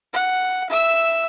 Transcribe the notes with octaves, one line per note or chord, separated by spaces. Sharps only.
F#5
E5 E6